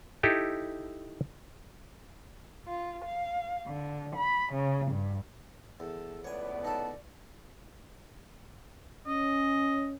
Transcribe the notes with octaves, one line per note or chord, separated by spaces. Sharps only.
D#4 E4 G4 A4
F4
F5
D3
B5
C#3
G2
E2 A4
C#2 A2 B3 C#5 D5 G#5
D#4 A4 A5
C#4 D#5